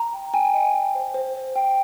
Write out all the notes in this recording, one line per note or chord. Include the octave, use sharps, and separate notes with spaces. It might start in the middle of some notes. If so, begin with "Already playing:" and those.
Already playing: A#5
G5
G5 G#5
D#5
G5
C5
C5
C5
G5